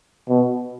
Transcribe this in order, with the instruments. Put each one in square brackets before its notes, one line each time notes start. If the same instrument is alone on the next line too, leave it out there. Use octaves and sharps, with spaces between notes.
[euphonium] B2